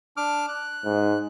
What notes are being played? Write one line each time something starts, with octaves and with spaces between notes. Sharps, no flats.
D4 D6 F6
F#6
G#2